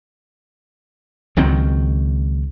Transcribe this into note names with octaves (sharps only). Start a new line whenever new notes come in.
C#2 D#3 F#3 C4